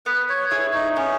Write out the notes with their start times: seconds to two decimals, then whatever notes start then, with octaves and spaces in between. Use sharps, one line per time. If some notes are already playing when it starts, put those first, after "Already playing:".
0.06 B3 B4
0.29 C#5
0.51 E4 G#4 C#5
0.73 D#4
0.96 B3 C#4